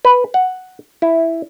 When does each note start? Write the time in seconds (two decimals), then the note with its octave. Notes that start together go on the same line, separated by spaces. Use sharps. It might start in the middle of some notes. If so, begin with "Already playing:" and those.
0.05 B4
0.34 F#5
1.02 E4